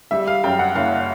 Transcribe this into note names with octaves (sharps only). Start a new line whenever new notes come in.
G3 E5
F5
F#2 G5
F#5
F#1 F5